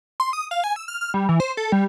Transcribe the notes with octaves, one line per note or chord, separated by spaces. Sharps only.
C6
D#6
F5
G#5
E6
F6
F6
G3
E3
C5
A4
G3